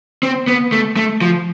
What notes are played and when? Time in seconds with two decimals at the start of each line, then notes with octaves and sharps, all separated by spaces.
0.23 C4
0.48 B3
0.72 A3
0.96 A3
1.22 F3